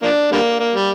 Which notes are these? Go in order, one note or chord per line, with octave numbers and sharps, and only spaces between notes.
F3 A#3 D4
D3 G3 A#3
A#3
G3